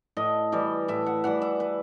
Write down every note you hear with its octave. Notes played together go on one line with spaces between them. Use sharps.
A2 D#5
E3 G3
A2 E5
F#5
E3 G3 F#5
E5
B4